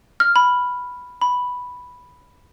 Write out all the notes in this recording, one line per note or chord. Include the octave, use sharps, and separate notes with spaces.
F6
B5
B5